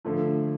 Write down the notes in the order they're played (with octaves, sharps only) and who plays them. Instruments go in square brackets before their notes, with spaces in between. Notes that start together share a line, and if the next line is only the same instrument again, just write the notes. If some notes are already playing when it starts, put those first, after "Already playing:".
[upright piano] D3 F3 A3